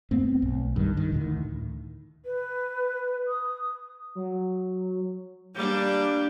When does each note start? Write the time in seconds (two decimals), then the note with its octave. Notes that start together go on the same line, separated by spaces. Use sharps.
0.11 G2 A3 B3 C4
0.42 B1
0.76 G2 D#3
0.97 D#3
1.12 D2 A2 D#3
2.25 B4
3.28 D#6
4.15 F#3
5.55 G3 A#3 D4 G6